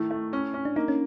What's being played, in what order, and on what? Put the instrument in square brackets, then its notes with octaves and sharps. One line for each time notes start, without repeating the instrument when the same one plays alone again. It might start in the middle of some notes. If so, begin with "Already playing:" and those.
Already playing: [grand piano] D#3 A3 [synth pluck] E4
[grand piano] A3
C#4
C#4
[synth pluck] D4
[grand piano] A#3 [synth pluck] D#4
[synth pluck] C#4